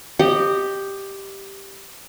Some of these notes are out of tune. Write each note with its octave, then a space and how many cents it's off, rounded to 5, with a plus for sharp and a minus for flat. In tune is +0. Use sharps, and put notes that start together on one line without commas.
G4 +0 D#5 -20